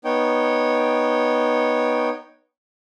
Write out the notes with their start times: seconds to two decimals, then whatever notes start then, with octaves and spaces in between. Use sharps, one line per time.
0.05 B3 D#4 C#5 G5